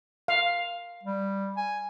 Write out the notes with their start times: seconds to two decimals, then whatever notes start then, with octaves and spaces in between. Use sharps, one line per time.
0.28 F5
1.03 G3
1.57 G#5